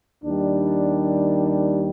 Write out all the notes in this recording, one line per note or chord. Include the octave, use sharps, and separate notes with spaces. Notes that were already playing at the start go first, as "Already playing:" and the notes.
D#2 D#3 G3 D4